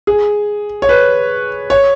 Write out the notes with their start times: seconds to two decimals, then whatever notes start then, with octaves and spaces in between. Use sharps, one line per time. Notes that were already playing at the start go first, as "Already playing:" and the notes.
0.07 G#4
0.82 C#5
0.89 B4
1.70 C#5